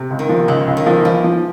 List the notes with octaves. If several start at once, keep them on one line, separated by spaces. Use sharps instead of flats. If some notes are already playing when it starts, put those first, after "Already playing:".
Already playing: C3
C#2
D#3
F3
C#2 C#3
C#2
D#3
F3
E3 F3
F3